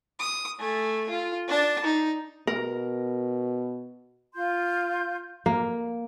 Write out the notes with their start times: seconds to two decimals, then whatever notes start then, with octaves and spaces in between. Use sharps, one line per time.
0.19 D#6
0.59 A3 G#5
1.09 F4
1.48 D4 A5
1.84 D#4
2.47 B2 A#4
4.33 F4 C6 G6
5.46 A#3